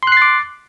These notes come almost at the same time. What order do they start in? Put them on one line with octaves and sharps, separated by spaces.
C6 F#6 C7 A6 D6